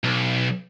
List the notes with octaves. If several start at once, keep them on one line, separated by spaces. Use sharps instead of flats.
B1